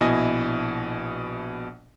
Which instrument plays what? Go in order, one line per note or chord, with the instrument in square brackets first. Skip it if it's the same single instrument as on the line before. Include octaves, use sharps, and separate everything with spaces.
[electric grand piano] A#1 B2 E4 D#5 G#5 A#6